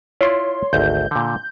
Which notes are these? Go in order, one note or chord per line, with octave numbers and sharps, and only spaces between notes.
E4 F4 C#5 D5 C6
G#1 D2 G6
A#2 D3